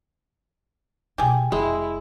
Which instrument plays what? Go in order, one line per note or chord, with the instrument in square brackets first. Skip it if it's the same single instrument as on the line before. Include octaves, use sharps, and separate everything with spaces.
[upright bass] B2 E4 [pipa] G4 G#4
[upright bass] F1 [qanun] G#3 [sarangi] E4